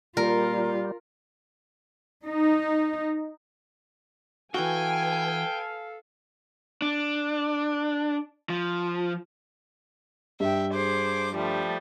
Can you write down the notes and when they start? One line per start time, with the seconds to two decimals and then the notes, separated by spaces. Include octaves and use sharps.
0.17 A#2 G3 F4 A#4
2.24 D#4
4.54 E3 F#4 A4 B4 F5 G5 G#5
6.82 D4
8.50 F3
10.40 G2 E5 G5
10.74 G#4 C5 D6
11.34 F3 G3 A3